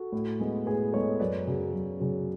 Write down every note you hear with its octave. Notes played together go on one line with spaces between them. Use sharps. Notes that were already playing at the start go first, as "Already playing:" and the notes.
Already playing: F#4 A4
A2
G#3 B3
A2 G#4 B4
G#3 B3 A4 C#5
F#2 B4 D5
C#3 F#3
F#2
C#3 F#3